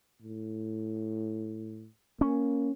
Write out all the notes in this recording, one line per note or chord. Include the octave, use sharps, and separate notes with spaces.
A2
A#3 C#4